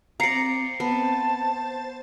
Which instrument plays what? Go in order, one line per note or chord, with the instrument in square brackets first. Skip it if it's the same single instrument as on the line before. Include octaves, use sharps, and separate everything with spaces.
[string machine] C4 [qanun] D5 A#5 [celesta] F5 C7 C#7
[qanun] B3 [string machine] C5 A6 [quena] A5